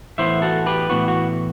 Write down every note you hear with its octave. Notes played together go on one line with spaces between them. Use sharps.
A2 E3 B3 C5 E5
F#4 A4
G4 B4
A2 E3 B3 F#4
F#4